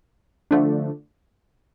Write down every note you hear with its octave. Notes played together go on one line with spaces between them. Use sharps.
D3 F3 A3 D4